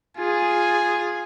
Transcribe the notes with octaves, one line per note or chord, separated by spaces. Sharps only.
F4 G#4 G#5